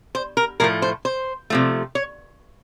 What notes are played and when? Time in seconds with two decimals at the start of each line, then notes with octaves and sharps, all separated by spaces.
0.15 C5
0.37 A#4
0.60 A2 F3 A3 A#4
0.82 C5
1.05 C5
1.50 C3 F3 A3
1.95 C#5